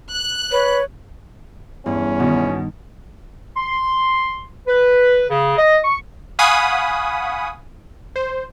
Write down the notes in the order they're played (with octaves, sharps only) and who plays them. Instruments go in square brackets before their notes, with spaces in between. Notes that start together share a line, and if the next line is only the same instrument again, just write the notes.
[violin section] F#6
[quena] B4 [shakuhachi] C#5
[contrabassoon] E2 [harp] G2 [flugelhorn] C#4
[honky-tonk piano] B2 [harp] D#3
[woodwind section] C6
B4
C#3
D#5
C#6
[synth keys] F5 F#5 G#5 B5 C#6 D#6
C5